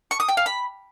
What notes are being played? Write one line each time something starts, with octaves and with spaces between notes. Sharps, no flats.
C#6
D#6
G5
F5
B5